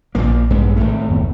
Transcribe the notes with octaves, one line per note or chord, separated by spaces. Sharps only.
A#1 A#2 F3 A#3
G2 G#3 B3
G#1 A2 A3
F#1 D#2 B3